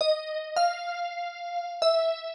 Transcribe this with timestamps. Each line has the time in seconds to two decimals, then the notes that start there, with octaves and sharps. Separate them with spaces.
0.01 D#5
0.56 F5
1.82 E5